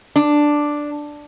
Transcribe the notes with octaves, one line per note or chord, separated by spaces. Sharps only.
D4